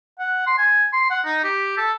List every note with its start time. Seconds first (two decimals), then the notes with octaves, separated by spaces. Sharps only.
0.19 F#5
0.47 C6
0.58 G#5
0.93 C6
1.10 F#5
1.25 D#4
1.44 G4
1.77 A4